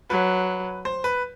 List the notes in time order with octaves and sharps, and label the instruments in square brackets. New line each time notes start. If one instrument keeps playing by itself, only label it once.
[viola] F#3 [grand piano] B4
[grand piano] C5
B4